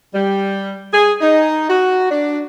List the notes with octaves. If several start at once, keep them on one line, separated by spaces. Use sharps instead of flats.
G3
G#4
D#4
F#4
D4